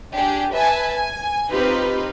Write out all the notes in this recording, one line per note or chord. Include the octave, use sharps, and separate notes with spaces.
D4 G4 G#4
B4 E5 G#5 A5
G#5
C4 D#4 F4 G4 B4